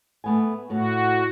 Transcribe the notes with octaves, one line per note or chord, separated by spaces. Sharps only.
A3 B3 G#5
A2 F#4